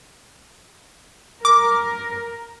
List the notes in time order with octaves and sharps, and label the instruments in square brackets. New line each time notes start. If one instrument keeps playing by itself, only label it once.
[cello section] A#4 [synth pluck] D6